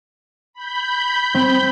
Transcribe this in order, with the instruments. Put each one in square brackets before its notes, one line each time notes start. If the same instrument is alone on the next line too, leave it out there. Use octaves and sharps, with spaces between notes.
[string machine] B5 G6
[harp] C4